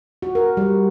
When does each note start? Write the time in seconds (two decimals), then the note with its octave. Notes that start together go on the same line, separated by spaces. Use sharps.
0.22 F#4
0.35 A#4
0.57 G3